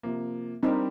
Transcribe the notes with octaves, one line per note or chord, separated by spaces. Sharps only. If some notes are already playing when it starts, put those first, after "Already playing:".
C3 F3 A#3
G3 C4 D4 D#4 G4 A#4